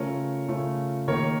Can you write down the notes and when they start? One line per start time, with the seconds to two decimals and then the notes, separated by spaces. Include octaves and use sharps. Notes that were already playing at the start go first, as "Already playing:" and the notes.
Already playing: C#3 A3 C#4 F4 A#4 C#5
0.48 C#3 A3 C#4 F4
1.08 D#3 A#3 D#4 A#4 C#5